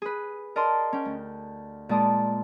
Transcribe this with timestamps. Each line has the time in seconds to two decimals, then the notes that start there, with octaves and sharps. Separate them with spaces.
0.02 G#4 B4
0.56 A#4 D5 D#5 A5 C6
0.93 C#4 G5
1.05 D2
1.89 A#2 G#3 D5 A5 D#6